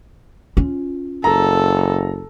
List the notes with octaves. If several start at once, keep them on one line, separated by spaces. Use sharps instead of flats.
C#4 F4
F#1 A4 A#5